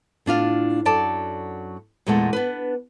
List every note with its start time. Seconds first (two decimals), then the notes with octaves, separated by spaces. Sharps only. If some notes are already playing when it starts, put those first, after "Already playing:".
0.26 A2 D4 F4 F5
0.85 F#2 F#3 A4 D5 A5
2.06 E2 A#2 G#3 A3 A4 F#5
2.33 B3 D4 B4